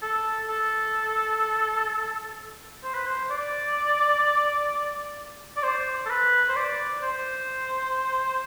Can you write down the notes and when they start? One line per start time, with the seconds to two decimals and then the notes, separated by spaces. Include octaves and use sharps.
0.02 A4
0.49 A4
2.84 C5
2.94 B4
3.07 C5
3.30 D5
5.57 D5
5.63 C5
6.06 A4
6.10 B4
6.49 C5
6.56 D5
7.03 C5